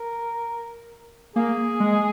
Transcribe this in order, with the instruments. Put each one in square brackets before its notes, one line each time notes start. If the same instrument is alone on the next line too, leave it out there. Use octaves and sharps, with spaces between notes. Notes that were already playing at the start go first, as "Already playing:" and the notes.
Already playing: [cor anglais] A#4
[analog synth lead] A#3 [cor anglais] G#4
[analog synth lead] G#3